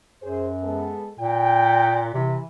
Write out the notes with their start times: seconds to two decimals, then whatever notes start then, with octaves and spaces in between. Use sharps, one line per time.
0.22 F#2 G#4 C5 C#5
0.62 G#3 B3 A4
1.20 A#2 G5
2.14 C3 E3